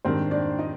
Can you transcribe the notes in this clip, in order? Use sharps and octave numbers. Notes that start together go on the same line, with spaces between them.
G#2 D#3 G3 C4 D4 C5
D4 D5
D#4 D#5